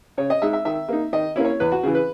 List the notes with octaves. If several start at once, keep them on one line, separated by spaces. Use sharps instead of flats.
C#3 C#5
D#5
G#3 D#4 E5
E5
D#3 E5
A#3 D#4
D#3 D#5
A#3 C#4 E4
C#5
E2 B4
F#4
C#3 E3 G#4
B4